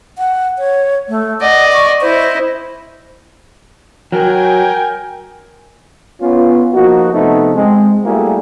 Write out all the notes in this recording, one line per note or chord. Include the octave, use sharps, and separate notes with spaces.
F#5
C#5
A3
D5 D#5 F#5
C#6
E4 C5 D#5
F#3 A#4 G5 G#5
B3 C#4 F4
F3 A#3 D#4 F#4
C3 F3 A3 B3 D#4
G#3 C4
G3 A3 A#3 E4 F#4 G#4